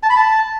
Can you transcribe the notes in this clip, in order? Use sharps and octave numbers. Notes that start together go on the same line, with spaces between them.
A5
B5
A5